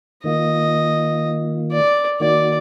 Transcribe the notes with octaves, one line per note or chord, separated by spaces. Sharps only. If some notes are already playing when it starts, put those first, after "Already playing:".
D#3 A#3 F4 D#5
D5
D#3 A#3 D#4 F#4 D5